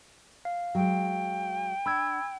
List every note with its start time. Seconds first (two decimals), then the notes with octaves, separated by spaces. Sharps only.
0.45 F5
0.75 F#3 G#3 G5
1.86 D4 B5 E6 G#6